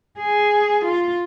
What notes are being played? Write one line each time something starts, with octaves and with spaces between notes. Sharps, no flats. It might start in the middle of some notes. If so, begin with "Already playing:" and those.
G#4
F4